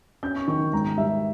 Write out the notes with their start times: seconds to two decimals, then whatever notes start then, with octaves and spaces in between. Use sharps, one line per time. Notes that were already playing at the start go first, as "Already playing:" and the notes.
0.23 C#4 G6
0.36 C#6
0.48 D#3 C#6
0.73 G#2 A#5
0.97 G3 E5